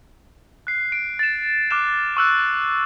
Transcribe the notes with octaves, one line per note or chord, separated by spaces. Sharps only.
F#6 C7
D7
A6 E7
D6 F6 F#6 E7
C#6 E6 F#6